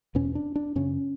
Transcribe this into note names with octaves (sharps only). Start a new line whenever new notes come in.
E2 B2 C#4
D4
D4
F#2 C#3 C#4